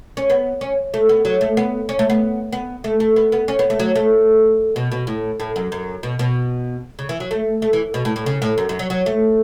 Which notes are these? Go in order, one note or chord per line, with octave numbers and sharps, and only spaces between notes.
C#4
B3
C#4
A3
B3
F#3
A3
B3
C#4
A3
B3
B3
A3
A3
B3
B3
C#4
B3
A3
F#3
A3
B2
B2
A2
A2
F#2
F#2
B2
B2
C#3
E3
F#3
A3
A3
E3
B2
A2
A2
C#3
A2
F#2
F#2
F#3
F#3
A3